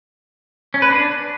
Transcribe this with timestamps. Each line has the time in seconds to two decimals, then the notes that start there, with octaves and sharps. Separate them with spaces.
0.74 C#4
0.82 B4
0.90 D4